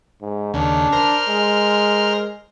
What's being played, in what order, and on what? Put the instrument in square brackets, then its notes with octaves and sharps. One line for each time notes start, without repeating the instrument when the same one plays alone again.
[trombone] G#2
[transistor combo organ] D#2 C#3 [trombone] D4
[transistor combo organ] A#4 C5 F6
[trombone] G#3